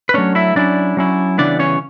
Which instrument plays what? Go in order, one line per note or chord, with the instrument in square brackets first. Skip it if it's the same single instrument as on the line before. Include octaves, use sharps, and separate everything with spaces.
[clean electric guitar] B4
F#3 A3 C#4 D4 C#5
E4 E5
F#3 C#4 D4 E4 D5
F#3 C#4 E4
C#3 E3 G3 B3 D4 D5
C#4 C#5